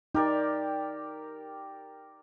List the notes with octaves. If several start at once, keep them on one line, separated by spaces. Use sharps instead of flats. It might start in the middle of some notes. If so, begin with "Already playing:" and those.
D#4 G4 A#4 D5